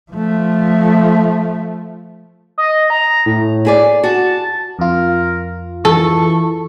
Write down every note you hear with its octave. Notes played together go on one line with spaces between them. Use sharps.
F3 A3
D#5
A#5
A2
E4 G#4 D5
F#4 A5
F2 F4 A#4
E3 A4 C#6